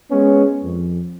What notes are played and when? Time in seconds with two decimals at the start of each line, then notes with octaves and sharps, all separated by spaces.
0.11 G#3 B3 C#4
0.64 F2